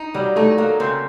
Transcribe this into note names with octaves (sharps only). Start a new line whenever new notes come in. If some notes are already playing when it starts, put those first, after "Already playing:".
Already playing: D#4
F#3 G3
A3 D#4
F#3 A#3
C#3 C4